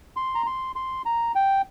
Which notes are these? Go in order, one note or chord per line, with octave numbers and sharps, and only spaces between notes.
C6
A#5
C6
C6
A#5
G5